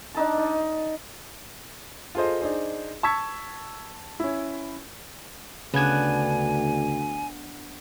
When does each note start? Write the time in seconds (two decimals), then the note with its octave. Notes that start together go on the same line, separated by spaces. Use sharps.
0.15 D4 D#4 A5
0.38 D#4
2.15 F4 G#4 A4 C5 D#5
2.41 D4 D#4 G#4 C5
3.03 A5 C#6 E6 G#6 B6
4.20 C#4 E4
5.74 D2 C#3 B3 D4 G#5 G#6